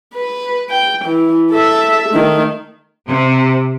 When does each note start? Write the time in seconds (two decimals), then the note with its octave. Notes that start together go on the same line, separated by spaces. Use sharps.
0.14 B4
0.70 G5
1.05 E3
1.52 A4 E5
2.10 D#3 A3
3.08 C3